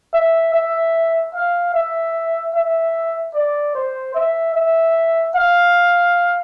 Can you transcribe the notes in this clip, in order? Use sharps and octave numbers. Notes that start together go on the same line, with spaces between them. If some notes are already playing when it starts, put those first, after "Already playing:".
E5
E5
F5
E5
E5
D5
C5
E5
E5
F5